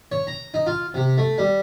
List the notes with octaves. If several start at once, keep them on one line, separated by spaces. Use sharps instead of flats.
C#5
A#5
D#4
F4
C3
A3
G3